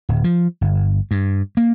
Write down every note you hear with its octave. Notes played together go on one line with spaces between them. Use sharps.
D1
F3
G1
G2
A#3